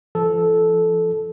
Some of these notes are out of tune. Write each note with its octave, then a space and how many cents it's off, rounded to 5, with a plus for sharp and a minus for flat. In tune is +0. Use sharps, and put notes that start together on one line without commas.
F3 -40 A4 -10